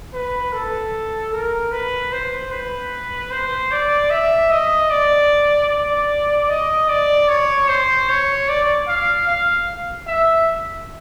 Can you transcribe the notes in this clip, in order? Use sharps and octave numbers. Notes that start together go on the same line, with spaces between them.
B4
A4
A#4
B4
C5
B4
C5
D5
E5
D#5
D5
D5
D#5
D5
C#5
C5
C#5
D5
F5
F5
E5